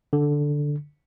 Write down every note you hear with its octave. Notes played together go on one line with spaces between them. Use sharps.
D3